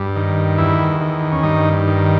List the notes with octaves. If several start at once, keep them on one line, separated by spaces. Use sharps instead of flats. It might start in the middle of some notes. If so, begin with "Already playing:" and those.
Already playing: G2
D#3
E2 E4
D#3
C#4
G2 D#4
D#3